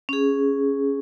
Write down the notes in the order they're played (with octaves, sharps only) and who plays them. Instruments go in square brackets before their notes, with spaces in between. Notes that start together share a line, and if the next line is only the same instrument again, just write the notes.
[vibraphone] C#4 G#4